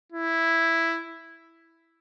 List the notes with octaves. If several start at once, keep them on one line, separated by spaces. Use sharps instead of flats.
E4